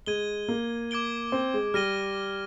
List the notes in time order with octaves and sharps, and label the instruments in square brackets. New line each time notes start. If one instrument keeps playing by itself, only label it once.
[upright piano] G#3 [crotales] G#6 D#7 G7
[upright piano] A#3
[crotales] D6 G#6 D7 G7
[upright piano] C4
G#3
[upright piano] G3 [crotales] F6 A#6 D#7 G7